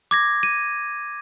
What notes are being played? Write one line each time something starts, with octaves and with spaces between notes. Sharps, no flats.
D6 G#6 A#6
D#7